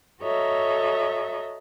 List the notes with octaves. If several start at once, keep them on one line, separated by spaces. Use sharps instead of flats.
F#4 A4 C#5 D#5 E5 A#5